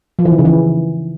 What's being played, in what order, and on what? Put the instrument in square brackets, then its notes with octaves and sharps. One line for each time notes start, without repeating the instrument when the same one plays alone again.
[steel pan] F3
E3
D#3
C#3
E3